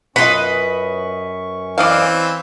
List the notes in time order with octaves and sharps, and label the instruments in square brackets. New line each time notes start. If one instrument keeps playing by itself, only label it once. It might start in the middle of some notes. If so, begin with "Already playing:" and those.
[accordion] F#2 C#4 C#6 [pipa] F4 F#5 [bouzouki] B4 D#5
[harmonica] E3 C4 [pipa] D5 D#5 F5